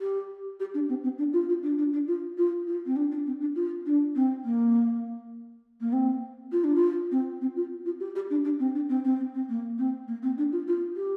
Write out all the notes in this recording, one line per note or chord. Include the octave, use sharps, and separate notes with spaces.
G4
G4
D4
C4
C4
D4
F4
F4
D4
D4
D4
F4
F4
F4
C4
D4
D4
C4
D4
F4
D4
C4
A#3
A#3
C4
F4
D4
F4
C4
C4
F4
F4
G4
G4
D4
D4
C4
D4
C4
C4
C4
C4
A#3
C4
A#3
C4
D4
F4
F4
G4